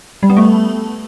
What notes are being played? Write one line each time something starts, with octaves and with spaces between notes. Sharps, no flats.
G3
B3
A3